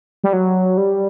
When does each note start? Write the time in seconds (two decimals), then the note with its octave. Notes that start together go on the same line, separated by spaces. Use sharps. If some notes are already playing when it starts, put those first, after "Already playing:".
0.24 G3
0.33 F#3
0.77 G3